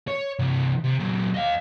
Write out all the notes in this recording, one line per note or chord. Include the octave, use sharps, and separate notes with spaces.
C#5
C3 E3
C3
A#2 F#3
D#5 F5